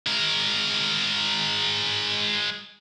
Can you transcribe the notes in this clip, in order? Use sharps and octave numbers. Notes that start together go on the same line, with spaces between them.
G#3 A#4